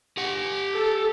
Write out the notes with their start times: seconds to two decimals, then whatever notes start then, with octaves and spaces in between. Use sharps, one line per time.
0.17 G4 F#5
0.74 A4